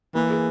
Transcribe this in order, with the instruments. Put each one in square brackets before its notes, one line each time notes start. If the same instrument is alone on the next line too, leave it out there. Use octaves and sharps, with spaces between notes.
[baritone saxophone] E3 [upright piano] A#3
[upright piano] G#4